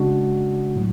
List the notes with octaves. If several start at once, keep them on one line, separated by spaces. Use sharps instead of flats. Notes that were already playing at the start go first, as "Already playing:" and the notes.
Already playing: C#3 G#3 D4 F#4
A2 F#3